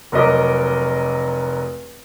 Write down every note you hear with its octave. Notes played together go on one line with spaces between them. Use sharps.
F1 F#3 A#4 D#5 D6